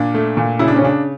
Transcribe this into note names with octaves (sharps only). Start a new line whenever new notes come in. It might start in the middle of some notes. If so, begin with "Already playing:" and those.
Already playing: A#2 D4
A3
A#2
C#3 E4
D4
C#4
C#3 D4